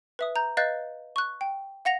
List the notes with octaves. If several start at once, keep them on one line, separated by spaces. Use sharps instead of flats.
B4 E5 D#6
A#5 G6
B4 D#5 F5 F#6 G6 A6
C#6 F#6
G5
F5 F#5 A#6 F7